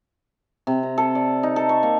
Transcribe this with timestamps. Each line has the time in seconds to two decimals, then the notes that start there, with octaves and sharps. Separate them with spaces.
0.67 C3
0.83 A#5
0.98 A4
1.15 D5
1.43 D#4
1.56 A4
1.69 C#6
1.83 A#3